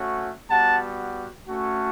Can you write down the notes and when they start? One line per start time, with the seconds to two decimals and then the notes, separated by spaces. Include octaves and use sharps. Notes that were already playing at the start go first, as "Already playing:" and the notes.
Already playing: A3 C#4 F#4
0.49 G3 B3 F#4 F#5 A5
1.48 A3 C#4 F#4